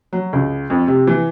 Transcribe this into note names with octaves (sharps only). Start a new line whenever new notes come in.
F#3
C#2
F2
C3
E3